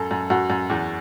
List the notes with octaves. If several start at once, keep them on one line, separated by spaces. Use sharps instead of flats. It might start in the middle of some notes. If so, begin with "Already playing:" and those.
Already playing: F#2 A4
F#2
F#2 F#4
F#2
E2